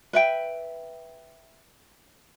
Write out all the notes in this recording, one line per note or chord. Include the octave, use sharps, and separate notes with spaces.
B4 E5 G5